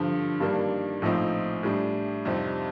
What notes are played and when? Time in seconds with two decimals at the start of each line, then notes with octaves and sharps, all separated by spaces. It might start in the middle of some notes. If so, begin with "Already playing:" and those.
Already playing: G2 D3 F3
0.40 G2 D#3 G3 A#3 D4
1.02 A#1 A2 F3 C4 D#4
1.63 A2 G3 D4
2.25 F2 C3 G3 C4 D#4